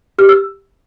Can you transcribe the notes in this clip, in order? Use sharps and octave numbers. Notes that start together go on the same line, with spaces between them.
G4 F6
E6